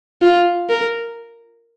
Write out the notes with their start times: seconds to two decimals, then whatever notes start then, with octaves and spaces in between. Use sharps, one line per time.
0.22 F4
0.70 A#4